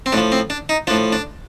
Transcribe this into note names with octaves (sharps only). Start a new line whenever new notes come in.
C4
A2 F3 D4
C4
D4
D#4
A2 F3 D4
D4